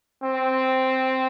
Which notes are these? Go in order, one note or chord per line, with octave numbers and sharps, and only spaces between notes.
C4